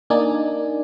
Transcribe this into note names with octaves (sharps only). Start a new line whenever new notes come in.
A#3 D4 D#4 D5 G#5